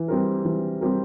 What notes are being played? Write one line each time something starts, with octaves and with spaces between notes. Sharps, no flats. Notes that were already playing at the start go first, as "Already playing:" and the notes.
Already playing: E3
G3 C4 G4 A#4
E3
G3 C4 G4 A#4